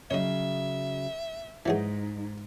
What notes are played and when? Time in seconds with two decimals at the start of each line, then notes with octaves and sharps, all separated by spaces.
0.11 C#3 F#3 C#5 D#5 E5
1.66 G#2 E3 F#3 D#4 G#4